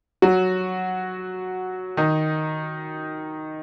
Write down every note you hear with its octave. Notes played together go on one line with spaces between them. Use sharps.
F#3 F#4
D#3 D#4